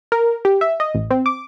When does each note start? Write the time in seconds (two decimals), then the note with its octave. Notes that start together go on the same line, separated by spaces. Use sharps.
0.12 A#4
0.45 G4
0.61 E5
0.80 D#5
0.94 A1
1.11 C4
1.26 D6